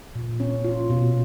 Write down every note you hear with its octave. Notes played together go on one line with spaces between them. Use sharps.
A#2
C#4
F4
B2